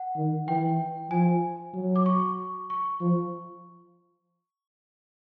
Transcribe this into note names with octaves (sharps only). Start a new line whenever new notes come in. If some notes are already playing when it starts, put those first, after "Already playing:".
Already playing: F#5
D#3
E3 G5
F3 G#5
F#3
D6
C#6
C#6
F3